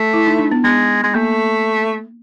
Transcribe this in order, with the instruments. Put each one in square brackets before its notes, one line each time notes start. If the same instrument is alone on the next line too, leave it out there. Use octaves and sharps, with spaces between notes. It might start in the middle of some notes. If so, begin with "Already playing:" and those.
Already playing: [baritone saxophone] A3
[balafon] E4
D#4
D4
B3
[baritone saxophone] G#3 [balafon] B3
[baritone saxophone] G#3
[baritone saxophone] A3 [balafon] A#3